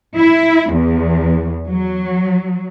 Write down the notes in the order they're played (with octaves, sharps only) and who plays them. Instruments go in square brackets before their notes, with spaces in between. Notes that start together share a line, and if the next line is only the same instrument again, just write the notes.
[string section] E4
E2
F#3